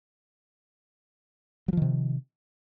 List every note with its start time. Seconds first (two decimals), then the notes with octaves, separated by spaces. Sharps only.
1.68 F#3
1.73 F3
1.77 D#3
1.82 C3